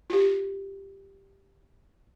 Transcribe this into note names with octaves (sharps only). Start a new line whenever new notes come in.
F4 G4